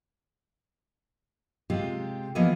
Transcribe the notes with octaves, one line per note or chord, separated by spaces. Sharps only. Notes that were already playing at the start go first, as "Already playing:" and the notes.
C3 G#3 F4 G4
E3 F3 A#3 B3 D#5